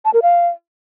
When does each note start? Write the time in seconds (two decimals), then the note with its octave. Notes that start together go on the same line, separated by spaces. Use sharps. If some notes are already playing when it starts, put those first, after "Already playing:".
0.05 A5
0.14 A#4
0.22 F5